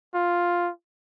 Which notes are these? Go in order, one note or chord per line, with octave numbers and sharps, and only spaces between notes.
F4